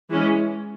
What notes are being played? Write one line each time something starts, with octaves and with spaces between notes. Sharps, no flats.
E3 G#3 C#4